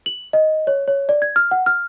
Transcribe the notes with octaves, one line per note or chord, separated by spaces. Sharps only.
F#7
D#5
C#5
C#5
D5
G#6
F6
F#5
F6